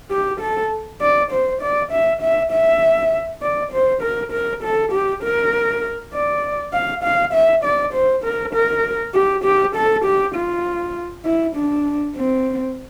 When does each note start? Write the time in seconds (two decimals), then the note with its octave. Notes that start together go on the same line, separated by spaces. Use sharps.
0.11 G4
0.40 A4
1.01 D5
1.32 C5
1.62 D5
1.92 E5
2.21 E5
2.52 E5
3.42 D5
3.72 C5
4.02 A#4
4.32 A#4
4.63 A4
4.92 G4
5.23 A#4
6.14 D5
6.73 F5
7.04 F5
7.34 E5
7.64 D5
7.94 C5
8.24 A#4
8.54 A#4
9.15 G4
9.44 G4
9.75 A4
10.05 G4
10.35 F4
11.25 E4
11.56 D4
12.16 C4